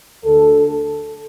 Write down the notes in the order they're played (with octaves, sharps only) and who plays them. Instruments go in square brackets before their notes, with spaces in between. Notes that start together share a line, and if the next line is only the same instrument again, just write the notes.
[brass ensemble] D2 D3 A4